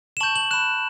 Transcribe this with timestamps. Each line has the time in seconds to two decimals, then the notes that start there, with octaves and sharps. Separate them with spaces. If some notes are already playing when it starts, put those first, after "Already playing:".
0.17 E7
0.20 A5 C#6 G6 F#7
0.36 F#7
0.51 B5 F#6 E7